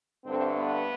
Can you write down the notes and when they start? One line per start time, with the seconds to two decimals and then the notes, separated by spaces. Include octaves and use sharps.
0.25 G2 D3 A3 C4
0.55 B3